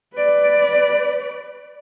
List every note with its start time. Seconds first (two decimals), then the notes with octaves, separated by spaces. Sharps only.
0.15 B4 D5